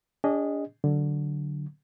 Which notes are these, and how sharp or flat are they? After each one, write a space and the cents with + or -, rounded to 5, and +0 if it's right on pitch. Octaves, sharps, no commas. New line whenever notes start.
D4 -35 G#4 -35 D#5 +0
D3 +0 F#3 +15